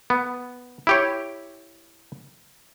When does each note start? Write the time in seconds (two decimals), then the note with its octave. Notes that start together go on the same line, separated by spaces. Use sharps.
0.10 B3
0.87 E4 G4 C#5